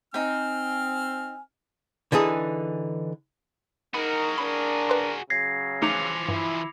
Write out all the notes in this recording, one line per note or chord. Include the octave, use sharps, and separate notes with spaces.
C4 D#4 G5 G#5 F6
D3 E3 D#4 G#4
D#4 F#4 G#4 A#4 B5
D4 A#4 B5
B4 C6
C#3 F#3 G#6 A#6 C7
E3 F3 A3 D#4 D6 C#7 F7
G2 E4